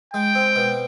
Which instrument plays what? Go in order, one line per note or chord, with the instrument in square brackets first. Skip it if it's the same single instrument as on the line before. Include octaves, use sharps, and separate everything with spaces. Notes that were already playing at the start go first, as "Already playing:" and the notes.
[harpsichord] G#3 [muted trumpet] G5
[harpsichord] C4
B2